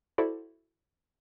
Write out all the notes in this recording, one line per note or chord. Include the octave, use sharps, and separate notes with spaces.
E4 F#4 A4 C5 D5